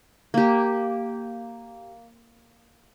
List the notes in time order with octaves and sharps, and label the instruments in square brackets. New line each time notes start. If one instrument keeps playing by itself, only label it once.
[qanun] A#3 G4